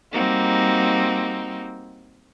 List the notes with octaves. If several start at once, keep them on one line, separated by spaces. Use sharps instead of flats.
G3 A#3 C4 D#4 F#4